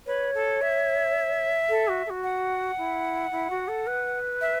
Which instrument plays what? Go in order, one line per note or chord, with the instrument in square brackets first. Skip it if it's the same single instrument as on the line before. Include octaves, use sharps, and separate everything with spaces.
[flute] B4 [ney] C#5
[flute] A4
E5
[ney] A4
F#4
A4
F#4
[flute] F#5
[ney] E4
E4
F#4
A4
B4
[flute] E5